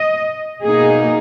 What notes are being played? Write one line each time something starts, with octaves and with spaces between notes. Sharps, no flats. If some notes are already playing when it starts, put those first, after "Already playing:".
Already playing: D#5
B2 A#3 D#4 G#4